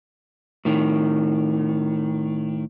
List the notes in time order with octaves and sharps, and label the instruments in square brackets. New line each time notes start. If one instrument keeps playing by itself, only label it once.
[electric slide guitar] A2 D#3